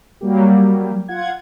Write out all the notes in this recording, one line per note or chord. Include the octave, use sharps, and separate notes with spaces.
F#3 G3 A#3 G4
F4 F#5 G#6